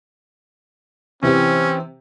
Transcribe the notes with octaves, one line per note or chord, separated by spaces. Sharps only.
C3 E3 C4 C#4 G4